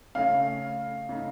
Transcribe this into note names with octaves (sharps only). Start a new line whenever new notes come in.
C#3 A3 C#4 F5
C#3 A3 D#4